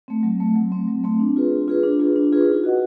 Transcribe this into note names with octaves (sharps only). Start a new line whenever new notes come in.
A3 C4
F#3
A3 C4
F#3
A3 C4
F#3
A3 C4
D4
F4 G#4 B4
D4
F4 G#4 B4
D4
F4 G#4 B4
D4
F4 G#4 B4
D#4
F#4 B4 D#5 F#5